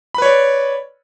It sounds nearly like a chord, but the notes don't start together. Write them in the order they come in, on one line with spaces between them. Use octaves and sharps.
B5 B4 C#5 D5